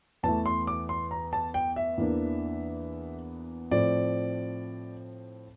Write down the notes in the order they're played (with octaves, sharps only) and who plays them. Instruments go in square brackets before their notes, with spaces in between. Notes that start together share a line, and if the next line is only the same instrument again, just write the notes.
[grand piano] E2 E3 A3 A5
C6
D6
C6
A#5
A5
G5
E5
E2 E3 A#3 D4
A2 F3 C4 D5